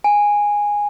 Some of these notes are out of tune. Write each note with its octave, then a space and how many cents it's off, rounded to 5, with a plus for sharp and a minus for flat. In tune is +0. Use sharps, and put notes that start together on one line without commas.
G#5 -10